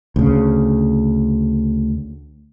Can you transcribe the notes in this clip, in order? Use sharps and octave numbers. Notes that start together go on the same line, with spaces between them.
D2 C#3